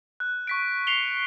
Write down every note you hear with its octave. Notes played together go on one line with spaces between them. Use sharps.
F#6
C#6 B6 D7
C7 C#7 F7 G7